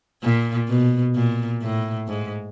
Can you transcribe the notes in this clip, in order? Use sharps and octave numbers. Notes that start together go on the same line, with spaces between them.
A#2
B2
A#2
A2
G#2